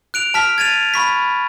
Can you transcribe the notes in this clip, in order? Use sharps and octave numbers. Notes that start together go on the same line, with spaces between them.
F#6 D7 F7
A5 F6 B6
G#6 A6 D#7 F7
B5 C#6 B6